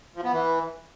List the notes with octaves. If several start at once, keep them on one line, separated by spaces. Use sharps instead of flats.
F3
B3
E3